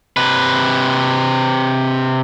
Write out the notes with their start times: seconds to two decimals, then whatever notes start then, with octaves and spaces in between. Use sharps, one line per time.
0.17 C3 B4